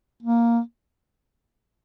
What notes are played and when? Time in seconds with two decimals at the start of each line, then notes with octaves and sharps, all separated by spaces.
0.23 A#3